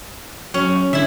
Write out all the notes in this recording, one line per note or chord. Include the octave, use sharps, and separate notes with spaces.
F#3 C#4
D3 E4 E5